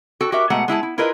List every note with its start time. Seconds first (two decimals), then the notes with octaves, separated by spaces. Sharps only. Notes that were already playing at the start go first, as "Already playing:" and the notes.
0.21 F#4 A4 G5
0.32 F#4 G4 A#4 E5
0.50 B2 G#3 A3 F#5 A#5
0.68 G#3 E4 G#4 A5
0.83 E4
0.98 E4 F4 G#4 A#4 B4 D#5